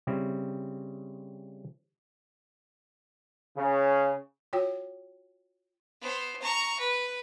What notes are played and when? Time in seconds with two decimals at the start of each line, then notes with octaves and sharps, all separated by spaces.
0.07 C#3 G3 C4 E4
3.56 C#3
4.53 F4 F#4 C#5 G5
6.01 B3 C5
6.41 A#5 C#6
6.79 B4